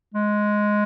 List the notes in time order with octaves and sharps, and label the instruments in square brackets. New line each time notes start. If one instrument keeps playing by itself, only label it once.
[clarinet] G#3